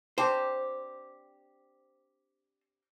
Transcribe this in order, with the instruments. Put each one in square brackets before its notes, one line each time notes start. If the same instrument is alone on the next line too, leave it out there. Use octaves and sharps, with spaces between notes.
[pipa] C4 D4 G4 [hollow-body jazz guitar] C5